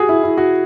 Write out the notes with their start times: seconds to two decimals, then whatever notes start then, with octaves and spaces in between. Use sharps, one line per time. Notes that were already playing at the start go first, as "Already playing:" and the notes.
Already playing: F#4 G#4
0.09 E4
0.23 E4
0.38 F#4